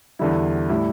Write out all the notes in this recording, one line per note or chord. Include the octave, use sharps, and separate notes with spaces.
E2 D3 G3 E4
A2 G3 E4